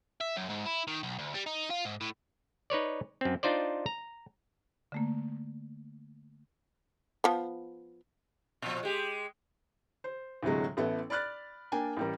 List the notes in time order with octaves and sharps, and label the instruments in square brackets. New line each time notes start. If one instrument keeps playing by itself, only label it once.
[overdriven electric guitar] E5
F#2
G#2
E4
D#3
B1
D2
G3
D#4
F4
G#2
A2
[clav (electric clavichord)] D#4 B4 C#5 D5
F#2 C4
D4 D#4 F4 C5 D5
A#5
[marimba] D3 A3 A#3
[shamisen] F3 B3
[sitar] A#2 F3
G#3 G4
[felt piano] C5
D2 A2 C3 F#3 G#3
A1 B3 E4 A4
D5 B5 F6 F#6 A6
A#3 D4 G5 G#5
A1 G3 A#4